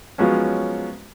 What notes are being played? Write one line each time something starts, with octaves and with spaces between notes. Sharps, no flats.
F3 F#3 G#3 B3 C#4